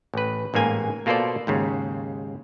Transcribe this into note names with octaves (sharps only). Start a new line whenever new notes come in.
A1 B4
A1 G#2 A#3 G#5
B2 A#3 F4 A4 C5 D5
D#2 G#2 C#3